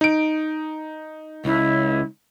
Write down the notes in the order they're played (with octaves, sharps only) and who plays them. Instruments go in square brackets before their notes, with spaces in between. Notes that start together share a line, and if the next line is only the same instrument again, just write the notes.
[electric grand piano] D#4 D7
[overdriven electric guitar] C#2 [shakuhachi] E4